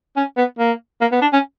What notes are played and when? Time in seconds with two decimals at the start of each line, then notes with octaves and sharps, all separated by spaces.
0.16 C#4
0.37 B3
0.59 A#3
1.01 A#3
1.12 B3
1.22 D4
1.33 C#4